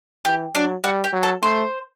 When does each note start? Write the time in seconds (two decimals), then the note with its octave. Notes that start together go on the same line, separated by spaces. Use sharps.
0.25 E3 G4
0.55 F#3 D4 D5
0.84 G3 F#4 F#5
1.04 G4 G5
1.13 F#3
1.23 A4 A5
1.43 A3 C5 C6